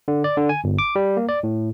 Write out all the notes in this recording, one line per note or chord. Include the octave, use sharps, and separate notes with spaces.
D3
D5
D3
G#5
G1
D6
G3
A#3
D5
A2